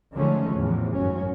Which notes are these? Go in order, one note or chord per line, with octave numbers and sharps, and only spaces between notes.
D3 D#3 F3 G#3 A3 C#4
E2 A2 C3 E3 F3
G#1 F#2 F#3 C#4